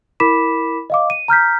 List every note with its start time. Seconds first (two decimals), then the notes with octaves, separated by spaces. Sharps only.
0.20 E4 A#4 B5 D6 B6 E7
0.90 D#5 F5 D6
1.10 D#7
1.28 A#5 F6 G6 B6